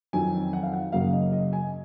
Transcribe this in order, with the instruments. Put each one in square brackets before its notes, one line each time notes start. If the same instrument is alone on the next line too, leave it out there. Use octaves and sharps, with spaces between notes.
[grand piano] F2 D#3 F#3 G#5
F#5
F5
F#5
F#2 C#3 F#3 A#3 F5
D#5
D#5
G#5